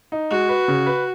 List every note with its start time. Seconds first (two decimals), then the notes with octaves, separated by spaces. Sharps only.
0.12 D#4
0.30 G#3 F#4
0.49 B4
0.68 C#3
0.86 B4